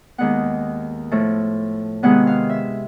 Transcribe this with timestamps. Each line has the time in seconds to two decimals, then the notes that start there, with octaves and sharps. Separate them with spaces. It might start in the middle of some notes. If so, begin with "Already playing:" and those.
0.18 D#2 D#3 G#3 B3 F#5
1.11 A2 F3 A3
2.03 C3 D#3 G#3 B3 F#5
2.27 F5
2.50 E5